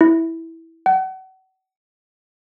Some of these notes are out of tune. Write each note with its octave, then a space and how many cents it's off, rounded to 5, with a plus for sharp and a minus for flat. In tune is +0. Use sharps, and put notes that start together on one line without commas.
E4 -10
F#5 +35